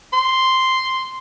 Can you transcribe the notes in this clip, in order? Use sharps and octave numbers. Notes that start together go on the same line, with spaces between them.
C6